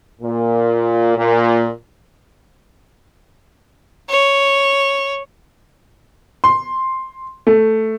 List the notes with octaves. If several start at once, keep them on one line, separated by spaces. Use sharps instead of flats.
A#2
A#2
C#5
C6
A3